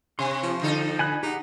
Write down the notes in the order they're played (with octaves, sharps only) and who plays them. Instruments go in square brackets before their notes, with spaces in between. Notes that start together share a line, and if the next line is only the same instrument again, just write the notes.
[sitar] C3 [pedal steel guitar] C6 C#6
[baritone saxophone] F3
[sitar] D3 D#4 A4
[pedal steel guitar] G#5 B5 F#6
[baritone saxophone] D#4 [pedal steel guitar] G4 G#4 F#5